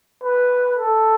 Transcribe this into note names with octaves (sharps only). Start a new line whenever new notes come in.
B4
A4